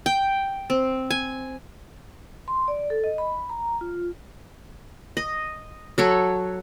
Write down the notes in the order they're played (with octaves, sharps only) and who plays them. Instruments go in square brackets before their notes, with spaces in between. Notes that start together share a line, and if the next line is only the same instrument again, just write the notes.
[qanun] G5
C4
G#5
[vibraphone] C6
D5
A4
D#5
B5
A#5
F4
[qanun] D#5
F#3 A4 C#5